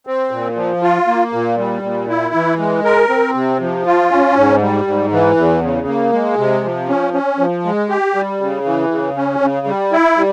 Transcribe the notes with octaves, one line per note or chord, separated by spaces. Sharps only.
C4
A#2
F3
F4
A#3
A#2
G3
A#2
E4
E3
G#3
A#4
C4
C3
F3
F4
C#4
G#2
G3
G#2
E3
E2
C#3
A#3
G#3
C3
F3
C#4
C#4
F3
G#3
G4
G3
C#3
E3
C#3
C#4
C#3
G3
E4
G3